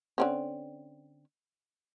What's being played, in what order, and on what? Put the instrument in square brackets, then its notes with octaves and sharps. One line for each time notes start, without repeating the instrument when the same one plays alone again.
[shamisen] D3 C4 C#4